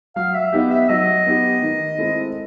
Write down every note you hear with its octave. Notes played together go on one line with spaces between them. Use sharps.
F#3 F5
E5
B3 D#4 G4
E5
F#3 D#5
B3 D#4 G4
D#3
G#3 C4 E4 A4